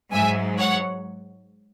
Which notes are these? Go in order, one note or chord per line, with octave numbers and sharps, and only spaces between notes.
G#2 F#3 E5 G#5
C#5 F#5